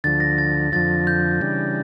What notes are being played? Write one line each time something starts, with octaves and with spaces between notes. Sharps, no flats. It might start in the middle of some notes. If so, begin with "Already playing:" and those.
D2 D3 F3 A6
A#6
A6
F2 D3 F3 A6
G6
C#3 E3 G3 D4